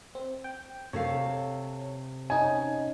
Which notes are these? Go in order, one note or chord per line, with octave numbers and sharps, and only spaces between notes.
C4
G5
C3 A4 C#5 F5
C#4 D#4 G#5